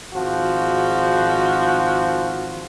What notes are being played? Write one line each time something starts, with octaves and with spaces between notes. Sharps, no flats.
G#1 F3 F#4